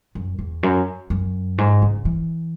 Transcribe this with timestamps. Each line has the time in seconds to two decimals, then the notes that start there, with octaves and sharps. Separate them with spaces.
0.15 F#2
0.39 E2
0.63 F#2
1.10 F#2
1.58 G#2
1.82 C#3
2.05 E3